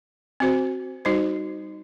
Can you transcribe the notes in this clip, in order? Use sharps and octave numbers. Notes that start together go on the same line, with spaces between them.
C4 F#4 C5
G3 D#4 F#4 C5